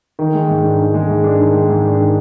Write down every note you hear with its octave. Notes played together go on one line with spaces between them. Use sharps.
D#3
G#3
G#2
D4
D#3
G#3
G#2
D4
D#3
G#3
G#2
D4
D#3